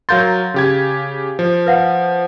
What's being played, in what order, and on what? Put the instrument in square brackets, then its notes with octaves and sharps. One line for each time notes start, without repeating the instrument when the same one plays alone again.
[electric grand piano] F#3 A#4 C6 [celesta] F5 G6 A6
[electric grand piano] C#3 G4 G#6
F3
[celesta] B4 F5 F#5